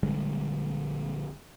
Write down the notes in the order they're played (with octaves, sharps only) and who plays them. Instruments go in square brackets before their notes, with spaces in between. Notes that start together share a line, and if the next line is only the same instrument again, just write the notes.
[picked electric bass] A#1 D3 G3 G#3